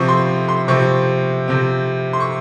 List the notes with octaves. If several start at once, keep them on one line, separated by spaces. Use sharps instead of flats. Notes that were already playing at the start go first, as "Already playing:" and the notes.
Already playing: C3 F3 C4 C#6
C6
C6
C3 F3 C4 C#6
C3 F3 C4
C6
C#6